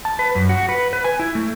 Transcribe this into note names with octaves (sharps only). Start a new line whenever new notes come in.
A5
B4
F#2
F#4
B4
B4
G#5
E4
A3